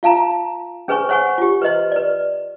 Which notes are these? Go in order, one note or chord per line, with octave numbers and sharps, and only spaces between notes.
F4 F5 A5 A#5
C#4 G#4 B4 C5 G#5 C#6
C5 C#5 F#5 G#5 C#6
F4 G4
B4 C5 D#5 C6
B4 D5